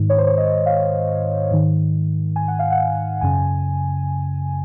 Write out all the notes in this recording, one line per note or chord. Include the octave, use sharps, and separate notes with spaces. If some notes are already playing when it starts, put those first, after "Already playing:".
Already playing: G#2 D#3
C#5
C5
C#5
D#5
F5
G#2 D#3
G#5
F#5
F5
F#5
F#2 C#3 G#5